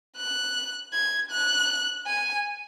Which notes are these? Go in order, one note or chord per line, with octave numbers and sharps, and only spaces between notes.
F#6
G#6
F#6
G#5